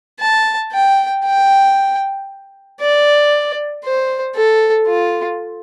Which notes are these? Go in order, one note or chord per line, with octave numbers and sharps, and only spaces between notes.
A5
G5
G5
D5
C5
A4
F4